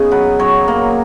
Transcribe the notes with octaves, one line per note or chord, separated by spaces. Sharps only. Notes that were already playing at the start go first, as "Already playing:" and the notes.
Already playing: C#3 B3 D#4 G#4
F#3 B4
F#3 C#5
A#3